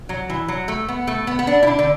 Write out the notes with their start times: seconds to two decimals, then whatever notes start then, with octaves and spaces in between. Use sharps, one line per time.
0.09 F#3
0.30 E3
0.48 F#3
0.68 A3
0.89 B3
1.07 A3
1.27 B3
1.39 B3
1.47 D4
1.63 E4
1.67 D4
1.79 D3